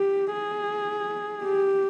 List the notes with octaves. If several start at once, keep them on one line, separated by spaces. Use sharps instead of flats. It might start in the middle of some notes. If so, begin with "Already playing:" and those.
Already playing: G4
G#4
G4